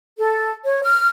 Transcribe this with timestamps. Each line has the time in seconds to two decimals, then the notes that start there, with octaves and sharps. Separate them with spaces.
0.19 A4
0.64 C#5
0.83 F6